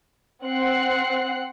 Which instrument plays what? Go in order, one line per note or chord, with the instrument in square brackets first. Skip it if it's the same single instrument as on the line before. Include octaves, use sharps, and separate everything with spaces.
[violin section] C4 F#5 F#6 C7